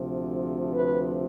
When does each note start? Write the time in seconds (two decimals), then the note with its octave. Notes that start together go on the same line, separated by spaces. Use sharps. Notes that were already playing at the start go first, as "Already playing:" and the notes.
Already playing: D2 C3 F3
0.73 B4